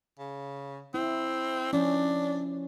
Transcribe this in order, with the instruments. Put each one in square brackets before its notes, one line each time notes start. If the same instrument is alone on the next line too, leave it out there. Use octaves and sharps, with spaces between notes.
[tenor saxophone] C#3
[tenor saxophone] C4 [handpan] E4
[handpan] F3 C#4 [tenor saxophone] D4